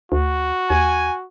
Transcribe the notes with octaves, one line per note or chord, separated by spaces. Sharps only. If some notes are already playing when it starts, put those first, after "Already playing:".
D2 F#4
D#2 G#5